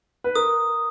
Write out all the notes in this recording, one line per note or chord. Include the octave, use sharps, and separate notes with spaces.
B4
A#4 D#6